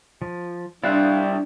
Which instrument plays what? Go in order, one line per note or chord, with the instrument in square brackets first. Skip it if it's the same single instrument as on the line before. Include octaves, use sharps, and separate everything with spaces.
[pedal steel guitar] F3
[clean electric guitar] G3 E4 [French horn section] D4 [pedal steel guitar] D5 F5 F#6